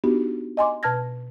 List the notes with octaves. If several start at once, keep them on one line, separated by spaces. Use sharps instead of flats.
B3 D4 D#4 F#4 G4
D#5 G#5 C6 D6
B2 B4 A5 F6 G#6 A#6